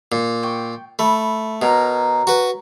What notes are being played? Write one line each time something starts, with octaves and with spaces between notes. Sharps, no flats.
A#2
G5 C#6
A3 B5 E6
B2 A#4 C#5 A#5
F#4 B4